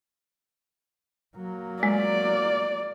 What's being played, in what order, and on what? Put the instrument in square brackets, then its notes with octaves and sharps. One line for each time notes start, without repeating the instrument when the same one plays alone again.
[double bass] F#3 A#3
[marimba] G#3 [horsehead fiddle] D5